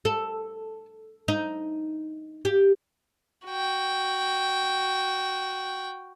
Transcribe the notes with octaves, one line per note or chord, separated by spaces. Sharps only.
A4
D#4
G4
F#4 G5